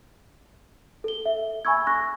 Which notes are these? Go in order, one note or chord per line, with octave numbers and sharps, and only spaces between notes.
A4 G7
E5
G#5 B5 C#6 E6 G#6
C#6 F#6 A#6